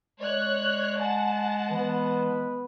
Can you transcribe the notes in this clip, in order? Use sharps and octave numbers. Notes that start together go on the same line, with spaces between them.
G#3 C#5 D5 F#6
F#5 G#5 A5
E3 B3 B4